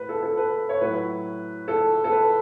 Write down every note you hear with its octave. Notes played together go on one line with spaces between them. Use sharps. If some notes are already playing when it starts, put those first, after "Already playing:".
Already playing: A2 B4
A4
A4
B4
C#5
A2 F#3 B4
A4
A4
B4